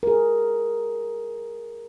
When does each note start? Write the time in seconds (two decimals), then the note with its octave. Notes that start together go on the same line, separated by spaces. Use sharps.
0.03 G#4 A#4